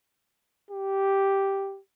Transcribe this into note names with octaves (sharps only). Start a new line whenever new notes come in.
G4